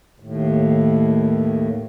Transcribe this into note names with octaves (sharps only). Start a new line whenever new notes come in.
D#2 A2